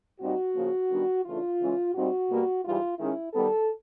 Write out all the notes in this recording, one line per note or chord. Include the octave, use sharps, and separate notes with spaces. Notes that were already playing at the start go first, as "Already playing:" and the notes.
A#2 G3 C4 D#4 F#4
C#3 F3 A#3
D#3 G3 B3 D4
C#3 E3 A3 D4 F4
C#3 E3 G#3 C#4
A#2 G3 C4 D#4 F#4
B2 G3 A#3
G#2 E3 G3 F4
D#3 G#3 C#4 E4
D#3 G3 B3 A4